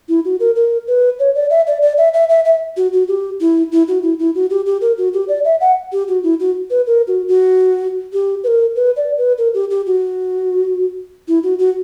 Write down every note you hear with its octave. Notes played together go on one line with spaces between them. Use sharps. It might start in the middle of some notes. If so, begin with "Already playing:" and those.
E4
F#4
A#4
A#4
B4
C#5
D5
E5
D5
D5
E5
E5
E5
E5
F#4
F#4
G4
E4
E4
F#4
E4
E4
F#4
G4
G4
A#4
F#4
G4
D5
E5
F#5
G4
F#4
E4
F#4
B4
A#4
F#4
F#4
G4
B4
A#4
B4
D5
B4
A#4
G4
G4
F#4
E4
F#4
F#4